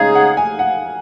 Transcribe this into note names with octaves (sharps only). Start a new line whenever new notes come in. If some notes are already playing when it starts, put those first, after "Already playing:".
Already playing: C#3 G#3 D#4 G#4 F5
F#5
G#5
F#5